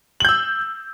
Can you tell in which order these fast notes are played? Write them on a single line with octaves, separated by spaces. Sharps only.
F#7 G6 E6